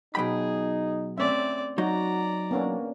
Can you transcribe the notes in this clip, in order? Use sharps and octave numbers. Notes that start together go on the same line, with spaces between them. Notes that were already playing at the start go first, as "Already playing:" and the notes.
B2 F#3 D#4 G#4 G5 B5
A3 C4 C#4 D5 E5
F#3 D#4 F#4 D5 A#5
A#3 B3 C#4 D4